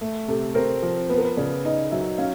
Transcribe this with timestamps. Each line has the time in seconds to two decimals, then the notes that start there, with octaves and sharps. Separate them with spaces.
0.01 A3
0.28 C3 A4
0.55 C4 A#4
0.83 F3
1.09 B3 B4
1.17 A#4
1.25 B4
1.37 C#3 D5
1.65 D#4 D#5
1.91 F#3 E5
2.18 C#4 F5